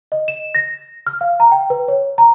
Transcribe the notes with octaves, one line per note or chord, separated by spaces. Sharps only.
D#5
E7
A#6
F6
F5
A#5
G5
B4
C#5
A#5